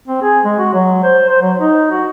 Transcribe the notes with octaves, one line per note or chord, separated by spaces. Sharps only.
C4
G#4
G#3
F#4
F#3
C5
C5
F#3
D#4
F#4